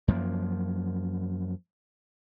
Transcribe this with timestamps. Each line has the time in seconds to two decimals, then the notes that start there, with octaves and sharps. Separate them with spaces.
0.08 F#2 F3 A#3